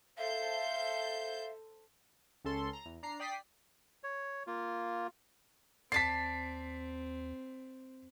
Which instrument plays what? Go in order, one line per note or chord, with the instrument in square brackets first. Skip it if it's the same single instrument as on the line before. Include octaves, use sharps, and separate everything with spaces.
[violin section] A4 C5 G6 [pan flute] E5 [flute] F5
[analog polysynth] C#2 C#4 A4 C6
A#5
E2
D4 A#5 C7
D5 G5 D#6 B6 C7
[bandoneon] C#5
A#3 F4
[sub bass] D#2 [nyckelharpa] C4 [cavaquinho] D5 A5 [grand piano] B6 C7